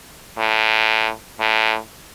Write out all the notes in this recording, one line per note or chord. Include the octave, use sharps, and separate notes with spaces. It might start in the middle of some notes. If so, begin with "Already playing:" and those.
A2
A2